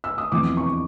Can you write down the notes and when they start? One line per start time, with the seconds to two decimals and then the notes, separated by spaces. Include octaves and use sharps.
0.04 E6
0.18 D#6
0.32 E2 C3 F3 D6
0.57 C#6